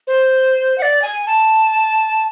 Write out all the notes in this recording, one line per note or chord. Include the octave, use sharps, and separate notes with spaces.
C5
F#5
D5
G#5
A5